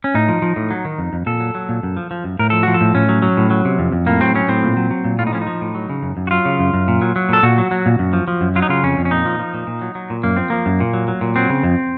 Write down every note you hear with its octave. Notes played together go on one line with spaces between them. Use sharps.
C#4
A2 D#4
F3
F3
A2
F#3
D#3
F2
F2
A#2 A4
F#3
F#3
A#2
F#2
F3
F3
F#2
A2 A#4
F3 A4
F3 F#4
A4
A2
A2 C#4
F#3
F#3
A2
F#3
C3
F2
F2
A2 A#3
F#3 C4
F#3 C#4
A2 C4
A#2
F#3
F#3
A#2
A2 F4
D#4
F3 C#4
D#4
F3
A2
F#3
C#3
F#2
F#2
F#4
F#3 F4
C#3
F#2
F#2
A#2
F#3
F#3
A#2 A4
A#2 F#4
F#3
F#3
A#2
F#2
F3
F3
F#2
F#3 F4
D#4
C#3 F4
F2 C#4
F2
C#4
A#2 D#4
F3
F3
A#2
A#2
F#3
F#3
A#2
F#2 A#3
F3 C4
F3 A#3
F#2
A#2
F#3
F#3
A#2
F#3 C4
C#3
F2